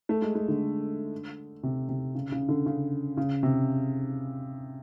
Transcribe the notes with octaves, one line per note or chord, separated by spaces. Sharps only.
A3
G#3
G#3
D3
C3
C3
C#3
C#3
D3
C#3
C#3
C3